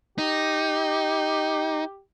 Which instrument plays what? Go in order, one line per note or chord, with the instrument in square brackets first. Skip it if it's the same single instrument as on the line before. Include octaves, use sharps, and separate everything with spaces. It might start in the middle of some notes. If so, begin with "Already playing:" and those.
[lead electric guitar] D#4 [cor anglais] G4